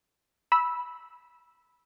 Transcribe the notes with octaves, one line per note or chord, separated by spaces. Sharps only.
B5 E6